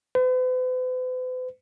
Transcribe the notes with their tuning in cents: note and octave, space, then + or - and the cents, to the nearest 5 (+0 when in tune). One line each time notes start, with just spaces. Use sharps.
B4 +45